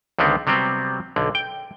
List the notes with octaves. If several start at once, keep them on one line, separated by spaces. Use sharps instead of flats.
C#2 D3 D#3 B3 C4
C3 F#3 G3 B3 C4
B1 D3
G5